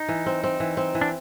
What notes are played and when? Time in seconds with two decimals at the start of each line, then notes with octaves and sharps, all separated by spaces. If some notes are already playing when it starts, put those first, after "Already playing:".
Already playing: D#4
0.08 E3
0.26 C4
0.44 C4
0.60 E3
0.77 C4
0.95 E3
1.01 D4